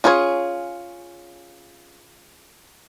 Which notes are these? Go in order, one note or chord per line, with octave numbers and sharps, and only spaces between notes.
C#4 F4 G#4 B4 C#5